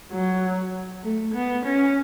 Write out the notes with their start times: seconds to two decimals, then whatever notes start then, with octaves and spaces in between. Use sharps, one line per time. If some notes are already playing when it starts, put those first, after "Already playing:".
0.12 F#3
1.03 A3
1.34 B3
1.65 C#4